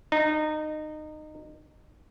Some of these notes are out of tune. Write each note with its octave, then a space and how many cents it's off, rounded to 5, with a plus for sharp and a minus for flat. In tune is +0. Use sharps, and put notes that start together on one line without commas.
D#4 -20